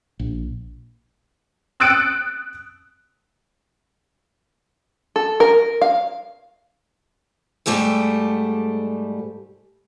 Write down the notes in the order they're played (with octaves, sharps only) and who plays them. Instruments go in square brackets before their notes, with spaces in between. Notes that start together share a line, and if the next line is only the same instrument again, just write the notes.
[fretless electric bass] A#1
[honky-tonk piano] D#6 E6 F#6 A6 C#7 D7
[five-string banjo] A4
A#4
F5
[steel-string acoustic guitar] G#2 G3 A3 G4 A4